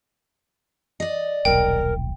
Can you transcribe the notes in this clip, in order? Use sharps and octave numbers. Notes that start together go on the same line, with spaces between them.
D5 D#5
D#1 B1 A#4 G5